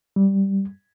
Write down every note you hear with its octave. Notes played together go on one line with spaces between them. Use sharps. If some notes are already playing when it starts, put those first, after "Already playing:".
G3